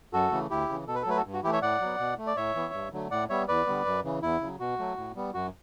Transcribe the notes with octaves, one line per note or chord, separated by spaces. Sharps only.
F#2 F#4 A4
C#3 E3 A3
D2 E4 G4
C#3 E3
B2 A4
B4
A4
F#3 A3 B4
F#4 A4
G2
F#4
E3 A3 E4 G4
C#5 E5
A2 D5 F#5
F#3 B3
B2
A3
D5
A2 C#5 E5
E3 B3
G2
D3 F#3 A3
A2 D5 F#5
G3 B3 C#5 E5
E2 B4 D5
D3 G3 B3
F#2
C#3 E3
E2 E4
C#3 F#3
B2 F#4
F#3 A3
A2
G3 B3
F#2 F#4